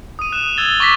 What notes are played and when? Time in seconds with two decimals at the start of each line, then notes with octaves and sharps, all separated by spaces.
0.19 D#6 D#7
0.32 F#6 E7
0.57 E6 G#6 A6 G7
0.80 C#6 D6 A#6 B6